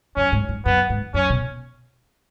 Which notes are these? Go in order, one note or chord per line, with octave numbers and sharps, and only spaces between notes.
F#2 C#4
G#2
G#2
F#2 B3
G#2
F#2 C#4
B2